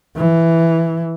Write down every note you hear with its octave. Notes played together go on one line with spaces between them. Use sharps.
E3